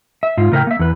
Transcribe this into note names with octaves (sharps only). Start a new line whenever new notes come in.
E5
G#2 F4
A2 C#3 A#4 B4 E5 G5
A#3 E5
E2 B4